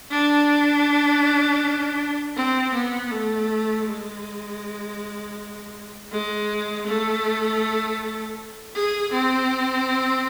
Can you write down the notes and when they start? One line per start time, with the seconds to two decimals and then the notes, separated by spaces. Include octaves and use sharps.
0.11 D4
2.36 C4
2.74 B3
3.11 A3
3.86 G#3
6.12 G#3
6.87 A3
8.75 G#4
9.13 C4